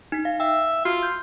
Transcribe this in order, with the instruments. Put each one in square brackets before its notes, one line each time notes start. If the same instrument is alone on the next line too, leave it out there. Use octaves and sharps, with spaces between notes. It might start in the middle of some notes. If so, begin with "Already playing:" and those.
[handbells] D#4 B6
F5
[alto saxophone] E5 [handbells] G5
[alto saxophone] F4 [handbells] F#4
[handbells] G6